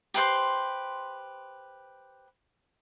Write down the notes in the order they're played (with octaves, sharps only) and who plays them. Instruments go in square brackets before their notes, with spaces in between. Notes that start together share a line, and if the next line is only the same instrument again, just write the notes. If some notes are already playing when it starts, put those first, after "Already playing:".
[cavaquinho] G4 B4 C5 C6